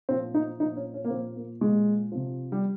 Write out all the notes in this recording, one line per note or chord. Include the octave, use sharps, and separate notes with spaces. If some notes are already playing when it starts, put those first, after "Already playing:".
A#2 F3 C4
D#4
A#2 F3 D#4
C#4
C#4
A#3
A#2 F3 C4
A#3
A#2 F3 G#3
C3 F3
G3